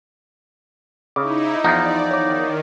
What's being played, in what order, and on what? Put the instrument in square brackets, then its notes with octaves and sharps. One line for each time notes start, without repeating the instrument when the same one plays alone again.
[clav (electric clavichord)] C#3 [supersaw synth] D#4 E4 [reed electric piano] D6
[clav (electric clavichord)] E2 F3 [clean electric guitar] D#4 [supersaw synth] D5
[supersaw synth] D#3 [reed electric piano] C#5 D6